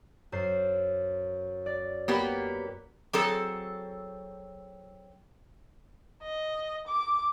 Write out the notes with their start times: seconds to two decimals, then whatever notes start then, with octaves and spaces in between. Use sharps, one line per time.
0.32 F#2 C5 C7
1.66 D5
2.08 A#3 B3 G4
3.13 F#3 C4 G#4 A4
6.23 D#5
6.87 D6